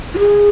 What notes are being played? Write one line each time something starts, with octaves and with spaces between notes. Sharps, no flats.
F4
G#4